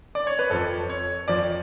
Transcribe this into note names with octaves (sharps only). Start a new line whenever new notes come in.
D5
C#5
B4
F2 F3 A4
C#5
F2 F3 D5